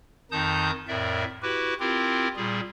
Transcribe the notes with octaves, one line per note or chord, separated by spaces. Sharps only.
F2 D#3 D#4 A5 D#6 G6
F2 A2 A#4 D5 E5
E4 F#4 G4 B4
C4 E4 F4 G4 A#4
A#2 G3 G#4